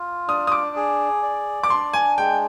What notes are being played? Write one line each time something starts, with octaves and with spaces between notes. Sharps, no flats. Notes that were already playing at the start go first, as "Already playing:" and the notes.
Already playing: F4
D4 D#6
D#6
D6
G#4
D5
D6
D4 C6
G#5
G#3 G5